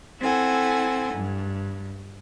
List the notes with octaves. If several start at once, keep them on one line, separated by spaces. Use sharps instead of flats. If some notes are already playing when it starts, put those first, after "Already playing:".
C4 E4 A4 F#5 G#5
G2